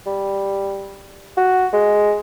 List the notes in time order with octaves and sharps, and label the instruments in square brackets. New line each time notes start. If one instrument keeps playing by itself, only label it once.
[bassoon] G3
F#4
G#3